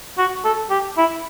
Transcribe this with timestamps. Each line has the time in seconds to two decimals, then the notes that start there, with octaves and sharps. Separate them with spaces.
0.18 F#4
0.45 A4
0.70 G4
0.97 E4